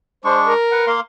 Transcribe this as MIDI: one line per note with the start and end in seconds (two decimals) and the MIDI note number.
0.25 0.54 56
0.25 0.54 62
0.25 0.38 72
0.25 0.54 85
0.45 0.92 70
0.71 0.86 71
0.71 0.86 78
0.87 1.00 58
0.87 1.00 77
0.87 1.00 84